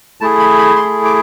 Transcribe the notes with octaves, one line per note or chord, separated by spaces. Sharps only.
A3 E4 G#4 A5
B5
B5
C6
D6